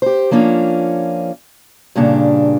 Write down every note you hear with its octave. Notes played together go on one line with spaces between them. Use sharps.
G4 C5
F3 A#3 C#4 D4 F4
G2 A#2 C#3 D4